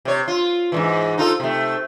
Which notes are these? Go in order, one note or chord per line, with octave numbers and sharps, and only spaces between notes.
C3 C#5
F4
G#2 D3 E3
D#4 F4 A4
C3 A3